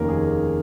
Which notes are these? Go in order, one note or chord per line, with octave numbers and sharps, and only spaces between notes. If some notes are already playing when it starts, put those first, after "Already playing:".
Already playing: F1 D#2 D#3 A#3 C#4 A#4
G#4